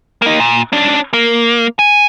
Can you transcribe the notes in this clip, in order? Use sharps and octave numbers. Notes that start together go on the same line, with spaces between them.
A#3 D#4
A#2
C#4 D4
A#3
G#5